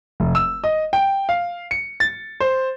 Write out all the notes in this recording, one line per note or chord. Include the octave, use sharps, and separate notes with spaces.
F1
E6
D#5
G5
F5
C#7
A6
C5